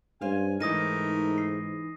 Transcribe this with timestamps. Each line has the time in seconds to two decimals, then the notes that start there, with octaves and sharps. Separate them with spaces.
0.21 G2 C#4 C5 F5 G#5
0.60 G#2 E3 A3 D#4 A#4 D#6 A#6 D#7
1.38 C7